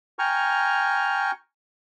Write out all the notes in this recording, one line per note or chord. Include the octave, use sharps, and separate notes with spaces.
G5 G#5 A#5 C#6 F6